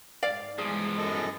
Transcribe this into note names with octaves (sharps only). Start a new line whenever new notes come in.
G#2 D5 F5
E2 G2 E3 F3 G#3 G#4
F#2 A4 D#5